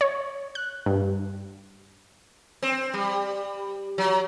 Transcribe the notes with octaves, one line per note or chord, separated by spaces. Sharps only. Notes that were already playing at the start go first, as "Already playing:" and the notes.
C#5
F#6
G2
C4
G3
F#3